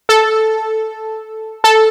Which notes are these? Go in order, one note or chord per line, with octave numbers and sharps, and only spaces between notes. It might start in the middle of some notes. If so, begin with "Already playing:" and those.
A4
A4